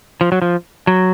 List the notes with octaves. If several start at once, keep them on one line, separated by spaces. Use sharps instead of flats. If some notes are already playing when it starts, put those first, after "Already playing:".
F3
F#3
F3
F#3